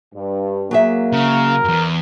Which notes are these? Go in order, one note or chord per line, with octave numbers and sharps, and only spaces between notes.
G2
F#3 A#3 G#4 E5
C#3 A#4
E2 G2